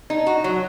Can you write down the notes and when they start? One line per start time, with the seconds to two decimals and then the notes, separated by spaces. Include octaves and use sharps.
0.10 D#4
0.26 F#4
0.44 F#3